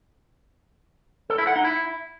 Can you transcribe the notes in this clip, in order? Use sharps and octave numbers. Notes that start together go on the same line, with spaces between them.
A4
E4
F#5
D#4
E4